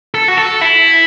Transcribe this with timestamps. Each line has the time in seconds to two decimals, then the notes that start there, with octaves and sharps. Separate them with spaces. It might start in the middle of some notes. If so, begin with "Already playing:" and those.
0.14 A4
0.28 F#4
0.37 A4
0.61 E4